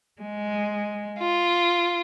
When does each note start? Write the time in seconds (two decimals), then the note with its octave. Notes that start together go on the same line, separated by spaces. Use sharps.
0.21 G#3
1.20 F4